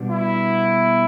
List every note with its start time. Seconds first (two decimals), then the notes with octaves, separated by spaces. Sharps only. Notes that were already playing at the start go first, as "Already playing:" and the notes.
Already playing: B2 G3 B3 D4
0.10 E4